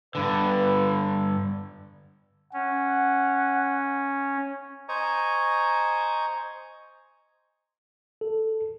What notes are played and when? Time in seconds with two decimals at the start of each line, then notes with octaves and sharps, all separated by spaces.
0.15 G2 D3 B4
2.53 C#4 F#5
4.89 C5 D#5 G#5 A#5 C#6
8.21 A4